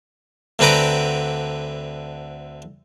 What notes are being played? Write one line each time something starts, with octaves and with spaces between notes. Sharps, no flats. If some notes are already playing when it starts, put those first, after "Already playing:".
D2 D3 C4 B4 A#5 D6